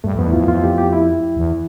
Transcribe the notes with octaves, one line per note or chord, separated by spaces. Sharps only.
G2 A3
F2
B3
E2 E4
F2 F4
F2 F4
G4
G4
E4
E2